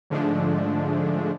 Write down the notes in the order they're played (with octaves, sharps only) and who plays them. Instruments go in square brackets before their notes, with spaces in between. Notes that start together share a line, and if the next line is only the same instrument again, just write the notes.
[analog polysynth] G#2 D3 F3 G#3 A3 D4